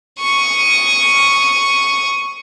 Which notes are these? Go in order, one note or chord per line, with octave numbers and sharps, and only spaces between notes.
C#6 D#6